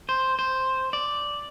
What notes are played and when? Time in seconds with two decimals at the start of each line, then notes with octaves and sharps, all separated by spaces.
0.09 C5
0.39 C5
0.93 D5